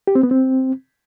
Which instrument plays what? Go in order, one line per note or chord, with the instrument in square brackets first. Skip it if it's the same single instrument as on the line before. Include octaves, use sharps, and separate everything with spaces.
[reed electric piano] G4
C4
B3
C4